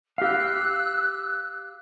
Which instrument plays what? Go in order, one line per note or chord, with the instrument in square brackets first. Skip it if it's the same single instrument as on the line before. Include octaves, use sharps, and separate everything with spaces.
[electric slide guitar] G4 F5 [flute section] E6 F#6